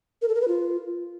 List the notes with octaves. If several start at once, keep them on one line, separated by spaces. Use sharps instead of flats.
A#4
A4
A#4
B4
F4